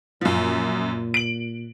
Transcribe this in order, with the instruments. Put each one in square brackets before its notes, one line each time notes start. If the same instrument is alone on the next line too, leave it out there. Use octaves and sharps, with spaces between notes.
[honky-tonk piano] F#2 F3 [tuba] A#2
[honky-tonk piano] D7 F#7